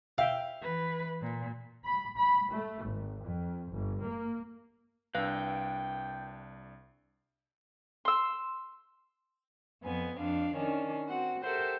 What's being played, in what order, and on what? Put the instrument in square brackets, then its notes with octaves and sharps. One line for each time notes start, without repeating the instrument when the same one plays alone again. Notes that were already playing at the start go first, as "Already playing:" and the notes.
[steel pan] E5 G5 [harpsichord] F5
[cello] E3 B4
A#2
[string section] B5
B5
A3
G#1
F2
G1
A#3
[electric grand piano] C2 D4 [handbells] B4 F5 F#6 [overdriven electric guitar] G5
[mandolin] C6 E6
[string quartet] F2 B3 G#5
F2 D4 F5
D#3 C#4 D4
C4 F#4 F#5
G4 A4 A#4 C5 E5 F#5